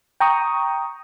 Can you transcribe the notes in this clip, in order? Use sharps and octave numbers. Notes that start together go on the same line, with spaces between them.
G5 A#5 C#6 D#6